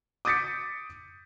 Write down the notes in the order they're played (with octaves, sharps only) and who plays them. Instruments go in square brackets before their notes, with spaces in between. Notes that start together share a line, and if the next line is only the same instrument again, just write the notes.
[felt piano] D6 D#6 G6 A6 B6 C#7